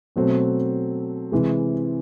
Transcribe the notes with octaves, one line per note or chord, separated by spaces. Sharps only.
B2 F#3 A3 C4
C3 E3 G#3